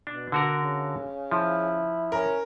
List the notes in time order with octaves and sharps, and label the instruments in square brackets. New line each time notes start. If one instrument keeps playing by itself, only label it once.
[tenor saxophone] B2 [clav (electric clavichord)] D4
[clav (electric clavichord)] D3 F#4 A#4
[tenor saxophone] C#3
[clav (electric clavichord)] F3 [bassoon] E4
[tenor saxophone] C#4 [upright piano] A#4